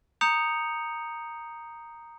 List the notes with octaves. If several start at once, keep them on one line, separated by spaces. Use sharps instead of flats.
A#5 D#6 G6 C#7 F7